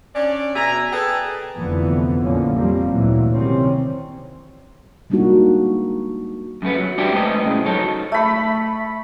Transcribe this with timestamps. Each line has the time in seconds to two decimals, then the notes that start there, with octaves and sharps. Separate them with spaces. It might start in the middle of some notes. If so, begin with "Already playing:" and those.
0.15 C#4 D4 D5
0.55 B2 E5 G#5 A#5
0.92 G#4 A4 B4 G5 A5
1.54 F1 F2 D3 E3 F3 B3
2.23 A#1 E2 D3 F3 A#3 C#4
2.53 F2 F3 G3 A#3 C4
2.89 D2 A#2 E3 F#3
3.31 C3 D#3 G3 C4 C#4
5.10 G3 G#3 A#3 D4 D#4 F#4
6.62 F#2 C#3 A3 B3
6.79 F#3
6.98 D4 G4 C5 D5 E5 G5
7.13 G#3 A3 B3 C5 D#5
7.43 A2 C#3 G#3
7.66 F#3 D#4 A4 C#5
8.12 A3 B5